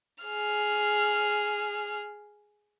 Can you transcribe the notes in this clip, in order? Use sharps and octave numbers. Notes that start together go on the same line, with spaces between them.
G#4 F6